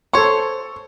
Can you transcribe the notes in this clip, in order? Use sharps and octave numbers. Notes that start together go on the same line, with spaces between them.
A4 C5 C#5 C#6